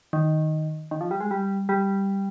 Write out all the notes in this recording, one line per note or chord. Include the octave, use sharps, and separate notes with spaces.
D#3
D#3
F3
G3
G#3
G3
G3